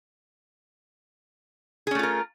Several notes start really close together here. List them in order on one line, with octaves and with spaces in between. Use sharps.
G#4 C#4 A3 F4 A#4